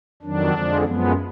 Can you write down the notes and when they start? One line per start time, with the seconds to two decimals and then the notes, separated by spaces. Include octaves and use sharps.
0.23 F2 D#3 F#3 D4
0.53 F2 D3 F3 G#3
0.85 F#2 F3 G#3 B3